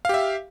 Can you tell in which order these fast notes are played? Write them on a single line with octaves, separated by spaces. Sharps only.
F5 G4 E5